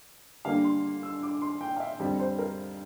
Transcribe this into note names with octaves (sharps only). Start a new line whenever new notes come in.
D3 G3 A#3 D4 F5
C6
E6
D6
C6
G5
F5
E5
F2 D3 G3 D5
C5
A#4